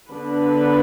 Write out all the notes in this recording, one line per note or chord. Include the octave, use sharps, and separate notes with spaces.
D3 B3 D4 B4